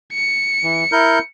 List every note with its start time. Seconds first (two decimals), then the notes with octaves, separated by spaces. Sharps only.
0.13 C#7
0.63 E3
0.92 E4 A#4 G6